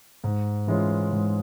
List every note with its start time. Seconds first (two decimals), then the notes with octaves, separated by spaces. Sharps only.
0.24 G#2
0.67 E3 G#3 C#4 F4
1.12 G#2